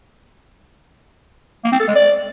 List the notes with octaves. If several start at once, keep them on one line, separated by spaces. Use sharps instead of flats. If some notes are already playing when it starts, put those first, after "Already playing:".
A#3
C4
A4
G#3
D5